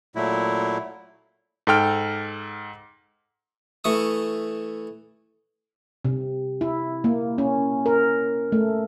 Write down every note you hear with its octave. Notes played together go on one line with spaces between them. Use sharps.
A#2 F#3 A3 E4
G#2 A4 G5 F6
E3 A3 C#6 D#6
C3
E4
A#3
C#4
A#4
A3